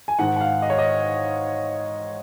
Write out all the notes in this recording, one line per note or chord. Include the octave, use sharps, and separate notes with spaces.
G#5
G#2 D#3 F#5
F#5
F5
D#5
C#5
D#5